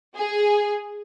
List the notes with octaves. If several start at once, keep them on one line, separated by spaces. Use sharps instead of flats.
G#4